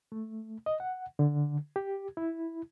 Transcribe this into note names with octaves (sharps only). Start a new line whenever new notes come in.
A3
D#5
F#5
D3
G4
E4